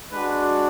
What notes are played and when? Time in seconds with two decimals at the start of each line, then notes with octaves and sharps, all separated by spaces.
0.12 G#3 D4 F#4 B4